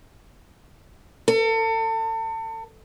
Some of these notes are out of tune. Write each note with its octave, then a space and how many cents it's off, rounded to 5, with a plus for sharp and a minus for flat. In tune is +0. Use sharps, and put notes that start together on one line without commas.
A4 +35